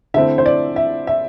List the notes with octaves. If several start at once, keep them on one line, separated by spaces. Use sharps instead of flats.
D3 A3 C4 E4 E5
C5
D5
E5
E5